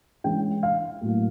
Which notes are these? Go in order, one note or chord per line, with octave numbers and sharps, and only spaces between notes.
E3 G#3 C#4 G5
F5
A2 F#3 A#3